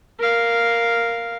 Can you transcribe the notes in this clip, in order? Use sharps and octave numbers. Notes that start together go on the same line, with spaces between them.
A#4 F5